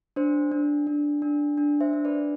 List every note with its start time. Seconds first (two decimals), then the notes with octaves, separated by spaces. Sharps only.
0.16 D4 C5
0.52 D4
0.87 D4
1.22 D4
1.57 D4
1.81 C5 E5
1.93 D4
2.05 B4 D5